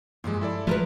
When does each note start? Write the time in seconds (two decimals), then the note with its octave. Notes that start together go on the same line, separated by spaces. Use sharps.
0.24 G2 A#2 F3 G#3 A5
0.41 E4 A4 D5
0.67 G#2 F3 F#3 G#3 A3 F4 A#4 B4